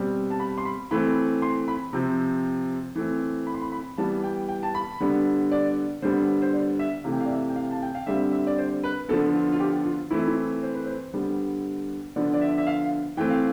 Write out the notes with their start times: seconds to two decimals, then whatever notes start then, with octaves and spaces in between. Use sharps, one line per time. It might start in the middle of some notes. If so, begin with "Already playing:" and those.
Already playing: B2 G3 C4
0.30 A5
0.40 B5
0.58 C6
0.65 B5
0.91 E3 A3 C4 B5
1.42 C6
1.68 B5
1.93 C3 F3 C4
2.95 E3 A3 C4
3.47 B5
3.54 C6
3.62 B5
3.72 B5
3.98 E3 G3 B3 A5
4.24 G5
4.48 G5
4.63 A5
4.75 B5
5.00 D3 G3 B3
5.51 D5
6.02 D3 G3 B3 C5
6.42 C5
6.53 D5
6.79 E5
7.04 C3 E3 A3 F5
7.12 G5
7.20 F5
7.26 D5
7.31 E5
7.49 G5
7.56 F5
7.71 A5
7.82 G5
7.95 F5
8.07 D3 G3 C4 E5
8.32 E5
8.47 D5
8.58 C5
8.84 B4
9.09 D3 F3 B3 A4
9.34 F4
9.52 F4
9.60 G4
9.85 F4
10.11 E3 A3 C4 E4
10.27 E4
10.63 C5
10.75 B4
10.86 C5
11.13 D3 G3 B3
12.16 D3 F3 B3 D5
12.34 D5
12.41 E5
12.58 E5
12.67 F5
13.17 E3 A3 C4 G5
13.30 F5